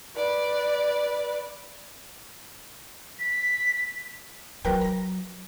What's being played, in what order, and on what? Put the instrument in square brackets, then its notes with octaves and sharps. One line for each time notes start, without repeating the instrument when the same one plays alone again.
[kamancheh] B4 D5
[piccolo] B6
[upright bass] F#3 [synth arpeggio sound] A#4 B4 G5
[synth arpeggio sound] A#5 A#6